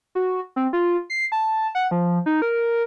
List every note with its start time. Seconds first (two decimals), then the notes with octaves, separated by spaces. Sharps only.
0.15 F#4
0.56 C4
0.73 F4
1.10 C7
1.32 A5
1.75 F#5
1.91 F3
2.26 D#4
2.42 A#4